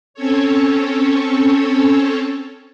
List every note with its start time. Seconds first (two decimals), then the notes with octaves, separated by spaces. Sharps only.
0.14 C4 C#4 A4 C#5